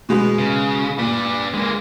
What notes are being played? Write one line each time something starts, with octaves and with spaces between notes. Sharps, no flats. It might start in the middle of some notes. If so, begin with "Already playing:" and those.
B2 G#3 B3
C#3
A#2 D4 B4
G#3 A#3